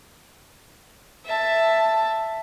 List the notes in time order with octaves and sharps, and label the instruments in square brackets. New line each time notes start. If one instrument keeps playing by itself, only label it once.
[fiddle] E5 A5